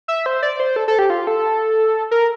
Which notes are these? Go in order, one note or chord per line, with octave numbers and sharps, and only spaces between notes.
E5
C5
D5
C5
A4
A4
G4
F4
A4
A#4